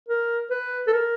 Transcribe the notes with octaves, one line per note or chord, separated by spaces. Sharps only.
A#4
B4
A4
A#4